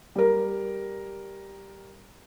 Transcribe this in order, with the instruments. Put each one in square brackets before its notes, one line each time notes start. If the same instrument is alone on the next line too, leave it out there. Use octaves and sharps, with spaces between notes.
[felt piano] G3 A#4